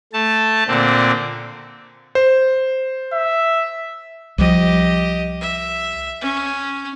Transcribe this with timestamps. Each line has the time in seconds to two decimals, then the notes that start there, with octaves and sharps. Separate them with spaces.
0.13 A3 A5
0.67 A#2 D3 C4
2.15 C5
3.13 E5
4.38 C2 F3 G4 D#5
5.41 E5
6.22 C#4